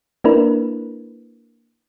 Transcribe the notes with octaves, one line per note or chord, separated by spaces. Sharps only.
A#3 D4 E4 A#4 B4